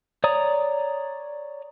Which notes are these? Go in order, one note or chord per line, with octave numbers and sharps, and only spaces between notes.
C#5 D5 A#5 D#6